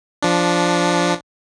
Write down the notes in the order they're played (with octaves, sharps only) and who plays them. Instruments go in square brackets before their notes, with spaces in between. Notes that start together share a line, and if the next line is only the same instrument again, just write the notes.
[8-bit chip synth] F3 D4